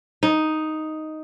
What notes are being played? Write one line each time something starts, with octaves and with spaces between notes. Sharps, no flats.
D#4